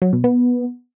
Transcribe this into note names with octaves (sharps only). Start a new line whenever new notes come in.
F#3
B2
B3